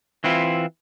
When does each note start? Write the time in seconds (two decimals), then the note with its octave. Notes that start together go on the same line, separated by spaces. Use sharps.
0.24 E3 C4 E4 F4